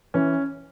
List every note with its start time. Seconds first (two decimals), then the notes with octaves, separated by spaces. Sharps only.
0.14 E3 C#4